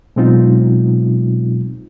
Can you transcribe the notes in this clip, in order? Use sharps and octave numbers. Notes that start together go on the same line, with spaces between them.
B2 F#3 G#3 C4 D#4 F4